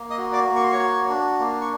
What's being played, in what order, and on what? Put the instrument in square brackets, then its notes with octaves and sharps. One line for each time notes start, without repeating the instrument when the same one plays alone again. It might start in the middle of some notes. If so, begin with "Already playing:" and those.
Already playing: [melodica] A#3
D#5 D#6
F#4
D5 D6
A#3
C#6
C6
C#5 C#6
F#4
D4
A#3
C#6